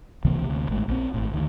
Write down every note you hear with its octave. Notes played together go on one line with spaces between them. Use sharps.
C#2 C3 E3 A#3
D2 C3
G#1 A2 G#3
A#1 A#2 D3 C4
G#1 A2
D2 D#3